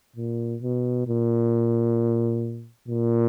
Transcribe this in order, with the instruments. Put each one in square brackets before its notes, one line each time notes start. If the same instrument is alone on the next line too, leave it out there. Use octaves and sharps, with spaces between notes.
[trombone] A#2
B2
A#2
A#2